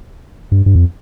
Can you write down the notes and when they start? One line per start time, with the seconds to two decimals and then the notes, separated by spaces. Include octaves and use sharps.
0.52 G2
0.66 G2
0.75 F2